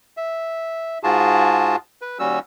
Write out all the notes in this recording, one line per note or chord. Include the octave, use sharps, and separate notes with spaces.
E5
G#2 F4 F#4 G#4 A5
B4
D#2 G3 C#4 F#4 E6